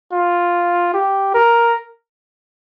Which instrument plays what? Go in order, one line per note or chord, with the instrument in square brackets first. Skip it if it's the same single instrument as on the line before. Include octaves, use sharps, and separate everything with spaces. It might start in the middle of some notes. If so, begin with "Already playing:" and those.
[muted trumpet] F4
G4
A#4